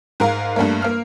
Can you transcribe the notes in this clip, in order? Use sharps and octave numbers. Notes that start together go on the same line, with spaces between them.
G#2 G#3 A#4 F5 A#5
G2 G3 A3 A#3
A#3 F6